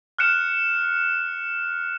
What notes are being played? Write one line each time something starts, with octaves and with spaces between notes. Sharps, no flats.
F6 F#6 C#7 E7